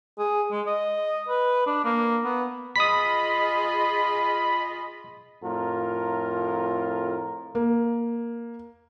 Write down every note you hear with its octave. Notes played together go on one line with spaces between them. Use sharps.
G#4
G#3
D#5
B4
D4
A#3
B3
F4 G#4 D#5 B5 D#6 B6
F2 A2 F4 A#4
A#3